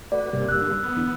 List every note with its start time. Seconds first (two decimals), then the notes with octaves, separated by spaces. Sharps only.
0.12 A3 F#4 B4 D5
0.33 G2 C3 G3 A#3
0.49 E1 E6 F#6
0.61 D3
0.82 B3
0.96 E2 D3 E3